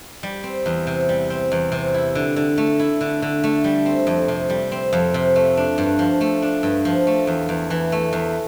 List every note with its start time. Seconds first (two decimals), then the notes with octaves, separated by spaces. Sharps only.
0.23 G3
0.44 C4
0.66 E2
0.87 C3
1.09 G3
1.30 C4
1.52 E2
1.72 C3
1.94 E4
2.15 D3
2.36 D3
2.58 A3
2.79 E4
3.01 D3
3.22 D3
3.44 A3
3.64 G3
3.86 C4
4.07 F2
4.28 C3
4.50 G3
4.72 C4
4.93 F2
5.14 C3
5.36 A3
5.57 D4
5.78 G2
5.99 F3
6.21 A3
6.42 D4
6.63 G2
6.85 F3
7.07 A3
7.27 E2
7.49 E2
7.70 E3
7.92 A3
8.13 E2